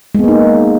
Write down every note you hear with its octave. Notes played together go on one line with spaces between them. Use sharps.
G#3 A#3 B3 D#4